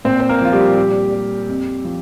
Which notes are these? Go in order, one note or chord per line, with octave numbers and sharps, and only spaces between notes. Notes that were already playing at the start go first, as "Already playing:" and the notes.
A#2 C4 C5
C5
A#3 A#4
F3 F4
G3 G4
A#2
G3
F2
F3